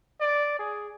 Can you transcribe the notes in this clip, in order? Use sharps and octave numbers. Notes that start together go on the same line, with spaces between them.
D5
G#4